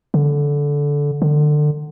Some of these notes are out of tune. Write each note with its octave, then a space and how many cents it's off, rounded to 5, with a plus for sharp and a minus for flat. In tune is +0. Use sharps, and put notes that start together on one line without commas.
D3 -15
D3 +25